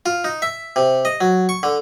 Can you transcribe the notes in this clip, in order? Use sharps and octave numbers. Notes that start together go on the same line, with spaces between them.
F4
D#4
E5
C3
D#5
F#3
C#6
D3